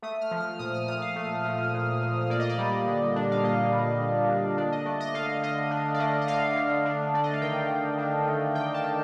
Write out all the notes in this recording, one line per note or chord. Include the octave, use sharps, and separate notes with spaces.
A3 D#6
F6
F3
F6
A#2 D#6
F6
A#2 D#6
F5
A3
F3
A#2
A#2
A#3 D5
D#5
D5
G3
D3
D4
F5
A#3 D#5
G3
D3
D4
D4 D5
D#5
A3 D5
D#5
D3 F5
D3 D#5
D4
D5
A3 D#5
D#5
D3 F5
D3
D4
A3 D5
D#5
F5
D#3 G5
D#3
D4
A3
D#3 G5
A5
D#3